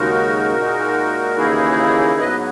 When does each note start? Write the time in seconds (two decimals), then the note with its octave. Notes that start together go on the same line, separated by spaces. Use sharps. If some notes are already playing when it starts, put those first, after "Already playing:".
Already playing: D#2 C#3 G#3 D#4 F#4 A#4
0.56 A#2 G#3 D#4
1.37 D#2 C#3 E3 A#3 D#4 E4 G#4
2.20 G#2 F#3 B3 B4 D#5